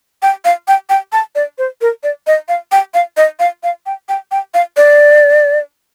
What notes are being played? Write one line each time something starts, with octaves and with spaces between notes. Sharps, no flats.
G5
F5
G5
G5
A5
D5
C5
A#4
D5
D#5
F5
G5
F5
D#5
F5
F5
G5
G5
G5
F5
D5